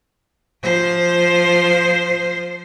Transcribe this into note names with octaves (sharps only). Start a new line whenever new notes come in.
F3 C5